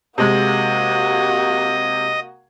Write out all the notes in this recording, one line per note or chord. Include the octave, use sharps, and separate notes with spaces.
C3 G#3 A#3 F#4 D#5